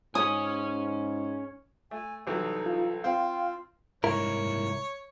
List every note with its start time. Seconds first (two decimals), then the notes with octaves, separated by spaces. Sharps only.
0.15 G#2 C#4 C#5 G#5 D#6
1.91 A3 G#5
2.27 C2 E3 F#3 D#4 A4
2.66 F4
3.04 C4 F4 F5 G5
4.04 C2 G#2 E4 A#4 C#5